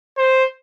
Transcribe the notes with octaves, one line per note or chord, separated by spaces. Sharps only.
C5